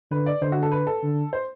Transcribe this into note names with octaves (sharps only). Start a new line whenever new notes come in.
D3 B4
D5
D3 C5
F#4
A4
B4
A4
D3
C5